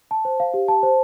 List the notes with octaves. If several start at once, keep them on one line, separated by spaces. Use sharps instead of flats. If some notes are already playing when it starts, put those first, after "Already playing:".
A5
C5
F5
G4
A5
C5